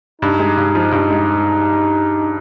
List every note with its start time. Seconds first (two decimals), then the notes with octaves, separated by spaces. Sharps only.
0.22 G2 D#4
0.39 G#3
0.57 G2
0.75 F3
0.92 G2
1.10 G#3